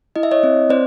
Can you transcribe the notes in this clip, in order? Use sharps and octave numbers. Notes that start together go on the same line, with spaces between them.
E4 D#5
E5
C#5 D#5
C4
C4 C5 D5